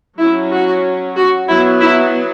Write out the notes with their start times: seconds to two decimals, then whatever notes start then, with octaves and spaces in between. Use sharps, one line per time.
0.20 F#3 C#4 E4
0.52 F#4
1.17 F#4
1.48 F#3 B3 E4
1.80 E4